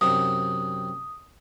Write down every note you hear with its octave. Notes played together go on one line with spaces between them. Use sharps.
F#2 C3 D#4 D#6